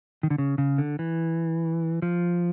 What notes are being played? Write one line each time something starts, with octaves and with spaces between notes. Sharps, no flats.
D#3
D3
C#3
C#3
D3
E3
F3